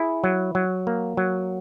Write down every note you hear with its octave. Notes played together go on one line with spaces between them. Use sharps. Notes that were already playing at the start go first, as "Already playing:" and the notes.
Already playing: E4 G#4
F#3
F#3
A#3
F#3